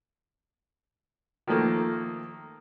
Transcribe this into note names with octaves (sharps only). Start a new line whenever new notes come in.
D#3 F3 A3 A#3